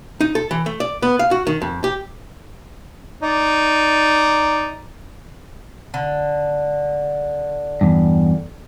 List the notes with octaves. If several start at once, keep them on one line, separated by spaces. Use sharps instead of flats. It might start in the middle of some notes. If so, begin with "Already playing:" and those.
D#4
A4
E3
A3
D5
B3
F5
F#4
D#3
F2
G4
D#4 D5
D3
E2 G2